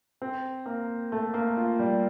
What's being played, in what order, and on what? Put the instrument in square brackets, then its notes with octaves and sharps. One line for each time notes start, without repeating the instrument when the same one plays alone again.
[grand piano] C4
A#3
A3
A#3
F4
G3